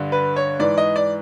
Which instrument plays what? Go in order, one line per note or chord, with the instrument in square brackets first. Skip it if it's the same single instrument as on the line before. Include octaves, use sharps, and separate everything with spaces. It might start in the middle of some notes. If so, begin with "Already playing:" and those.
Already playing: [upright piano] G2 D3
B4
C#5
G#2 E3 D5
D#5
D5